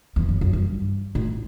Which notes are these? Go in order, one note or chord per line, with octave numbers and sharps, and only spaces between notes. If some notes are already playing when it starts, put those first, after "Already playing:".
E2
F#2
F#2
G2
A2